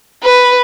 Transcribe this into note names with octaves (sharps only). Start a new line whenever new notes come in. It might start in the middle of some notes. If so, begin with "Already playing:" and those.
B4